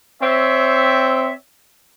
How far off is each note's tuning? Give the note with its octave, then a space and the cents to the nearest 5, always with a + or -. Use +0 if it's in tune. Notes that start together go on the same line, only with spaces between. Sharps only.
C4 +0 C#5 +20 E5 +0